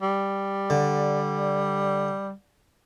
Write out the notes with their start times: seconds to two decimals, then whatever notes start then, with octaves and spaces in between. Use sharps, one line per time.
0.02 G3
0.70 D3